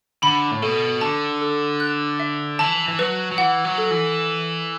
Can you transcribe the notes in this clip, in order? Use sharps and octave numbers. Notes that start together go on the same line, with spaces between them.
D3 B5
A2
B2 A4
D3 A5
A4
F#6
E5
E3 A5
E3
F#3 B4
F#3
E3 F#5
F#3
A4
E3